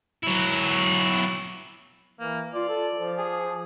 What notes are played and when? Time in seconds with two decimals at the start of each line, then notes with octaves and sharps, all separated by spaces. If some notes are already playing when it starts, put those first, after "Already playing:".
0.23 F#3 E4
2.20 E3 A#3
2.54 F4 D5
2.69 A4
2.94 F3
3.18 G#4